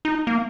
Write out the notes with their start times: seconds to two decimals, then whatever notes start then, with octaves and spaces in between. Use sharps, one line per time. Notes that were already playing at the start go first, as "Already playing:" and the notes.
0.05 D#4
0.27 A#3